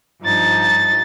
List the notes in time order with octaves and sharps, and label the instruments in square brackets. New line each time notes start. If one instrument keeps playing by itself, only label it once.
[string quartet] G2 F3 D#4 A6